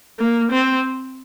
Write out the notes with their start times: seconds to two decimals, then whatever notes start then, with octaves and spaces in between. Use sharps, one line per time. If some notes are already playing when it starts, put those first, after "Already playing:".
0.19 A#3
0.52 C4